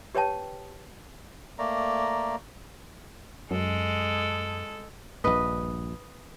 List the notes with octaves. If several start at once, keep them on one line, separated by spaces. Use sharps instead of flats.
G4 B4 C#5 G5 A5
A3 A#3 D5 A#5
F#2 G#3 A4
A#1 G2 B4 D#5